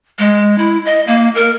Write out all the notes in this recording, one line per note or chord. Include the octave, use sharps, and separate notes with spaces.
G#3
E4
D#5
A#3
A#4